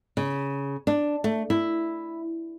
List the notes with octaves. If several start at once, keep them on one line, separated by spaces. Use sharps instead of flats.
C#3
D4
A3
E4